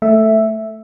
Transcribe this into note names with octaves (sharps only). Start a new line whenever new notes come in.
A3 E5